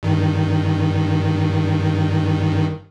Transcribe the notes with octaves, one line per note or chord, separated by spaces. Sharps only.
G2 D#3